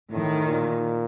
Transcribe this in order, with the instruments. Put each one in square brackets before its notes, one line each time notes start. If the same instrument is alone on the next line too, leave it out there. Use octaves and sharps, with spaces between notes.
[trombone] A2 [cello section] D#3
[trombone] A#2